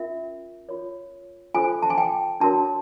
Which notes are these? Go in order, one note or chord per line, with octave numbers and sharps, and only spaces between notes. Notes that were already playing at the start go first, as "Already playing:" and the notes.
Already playing: C#4 F4 A#4 E5
F4 A#4 C#5
F4 A4 C5 G#5
A5
G#5
G5
D4 F#4 A#4 C#5 A5